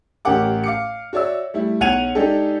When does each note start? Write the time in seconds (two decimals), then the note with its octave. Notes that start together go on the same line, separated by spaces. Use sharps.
0.25 A1 C#4 G4 A#4 F#5 D6
0.64 F5 D6 C#7
1.13 F#4 C#5 D5 E5 E6
1.54 G3 A3 E4
1.80 B1 C#5 F#5 G#6 D#7 F7
2.15 G#3 D4 D#4 G4 A4